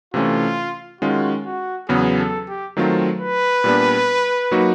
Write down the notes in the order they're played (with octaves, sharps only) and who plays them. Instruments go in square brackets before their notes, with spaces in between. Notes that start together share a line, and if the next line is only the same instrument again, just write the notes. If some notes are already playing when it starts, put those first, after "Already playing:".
[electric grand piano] C3 E3 A3 C#4 [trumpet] F4
[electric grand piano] D#3 G#3 C#4 F4 [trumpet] F#4
[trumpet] F#4
[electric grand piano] E2 C#3 F#3 B3 [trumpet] G#4
[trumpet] A4
G4
[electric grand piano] D#3 F#3 A3 C4 F4
[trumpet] B4
[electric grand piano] A#2 G3 B3 D4
F#3 A#3 D#4 F#4